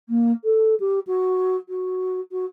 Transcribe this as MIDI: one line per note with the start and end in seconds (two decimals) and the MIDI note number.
0.09 0.32 58
0.44 0.75 69
0.80 1.00 67
1.07 1.57 66
1.69 2.20 66
2.32 2.45 66